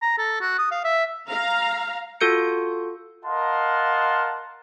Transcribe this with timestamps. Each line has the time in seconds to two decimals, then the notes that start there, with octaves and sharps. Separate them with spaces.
0.02 A#5
0.18 A4
0.41 F#4
0.58 D#6
0.71 F5
0.84 E5
1.28 F5 A#5
2.21 F4 F#4 A4 G6 C#7
3.24 A#4 D#5 F5 F#5 A5 C6